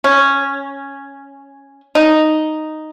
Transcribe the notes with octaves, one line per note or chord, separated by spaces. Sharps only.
C#4
D#4